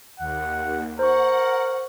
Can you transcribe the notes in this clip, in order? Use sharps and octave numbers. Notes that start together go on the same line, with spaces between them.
D#2 F#5
A#4 C5 F#5 C#6